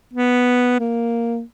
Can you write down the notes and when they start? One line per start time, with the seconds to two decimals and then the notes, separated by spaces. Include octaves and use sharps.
0.13 B3
0.79 A#3